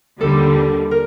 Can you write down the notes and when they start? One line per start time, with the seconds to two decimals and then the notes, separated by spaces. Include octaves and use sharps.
0.20 D#2 D3 G3 A4
0.91 A#4